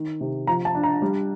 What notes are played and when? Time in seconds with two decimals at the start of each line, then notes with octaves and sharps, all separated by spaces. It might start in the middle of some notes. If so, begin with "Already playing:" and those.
Already playing: D#3
0.21 C3
0.47 F3 A#5
0.65 A5
0.75 D4
0.83 A#5
1.02 G3